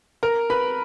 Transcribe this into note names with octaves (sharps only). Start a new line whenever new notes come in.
A#4 A#5
B4 B5